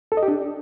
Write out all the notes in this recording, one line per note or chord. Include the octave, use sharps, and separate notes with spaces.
A4
D#5
G4
D4